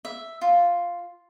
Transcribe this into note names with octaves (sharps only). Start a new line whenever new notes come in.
E5
F4